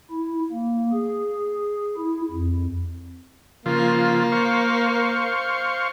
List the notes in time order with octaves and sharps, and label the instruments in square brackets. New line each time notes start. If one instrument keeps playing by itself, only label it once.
[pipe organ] E4
A#3
G#4
E4
F2
[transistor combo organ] C#3 F3 F4 [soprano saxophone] A#3
[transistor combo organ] C5 F5 C#6